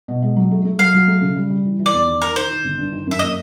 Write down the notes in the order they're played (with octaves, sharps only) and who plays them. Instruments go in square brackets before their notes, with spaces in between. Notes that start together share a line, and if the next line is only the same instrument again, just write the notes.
[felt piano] B2
G#3
F#3
A3
A3
[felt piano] F#3 [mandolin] F5
[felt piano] F#3
A3
C#3
G3
G3
E3
E3
[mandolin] D5
[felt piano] E2
D#3
[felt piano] D#3 [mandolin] A#4
[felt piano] D#3 [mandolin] C5
[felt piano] D#3
G1
G2
D#3
[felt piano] F#2 [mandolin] E5
[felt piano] A#3 [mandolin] D#5